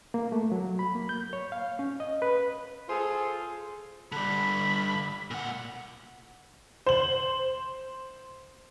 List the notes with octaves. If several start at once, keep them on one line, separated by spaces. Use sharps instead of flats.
A#3
A3
F#3
B5
A#3
G6
C#5
F5
C#4
D#5
B4
F4 G#4 A4 C5
D3 G3 B5
A#2 F#5
C5 F#7